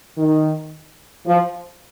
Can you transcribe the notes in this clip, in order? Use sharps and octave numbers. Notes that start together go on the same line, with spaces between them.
D#3
F3